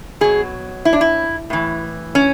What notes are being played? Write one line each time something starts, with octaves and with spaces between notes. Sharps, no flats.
B2 F#3 G#4
E4
D4
E4
A2 E3
C#4